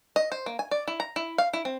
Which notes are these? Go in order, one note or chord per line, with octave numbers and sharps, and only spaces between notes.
D#5
C5
A#3
G#5
D5
E4
A#5
E4
F5
E4
C4